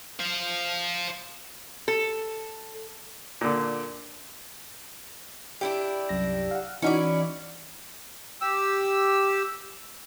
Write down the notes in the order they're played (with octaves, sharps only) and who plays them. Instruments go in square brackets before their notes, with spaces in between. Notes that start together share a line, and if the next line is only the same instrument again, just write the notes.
[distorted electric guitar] C5 F5
[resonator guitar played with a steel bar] A4
[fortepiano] A#2 D3
[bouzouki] D4 E4 G4
[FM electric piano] C2 F#2 A#6
F5 F#5
[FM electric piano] E3 D#4 F#4 [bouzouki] C#4 E4 D5
[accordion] G4 E6